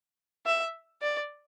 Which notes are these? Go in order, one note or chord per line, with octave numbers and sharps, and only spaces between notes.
E5
D5